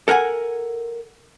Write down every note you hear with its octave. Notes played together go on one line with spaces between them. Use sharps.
A4 A#4 F#5 G#5